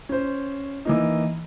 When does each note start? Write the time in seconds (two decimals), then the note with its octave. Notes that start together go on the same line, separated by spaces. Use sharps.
0.09 C#4 C5
0.85 E3 A#3 D#4